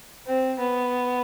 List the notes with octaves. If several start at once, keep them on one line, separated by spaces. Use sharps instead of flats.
C4
B3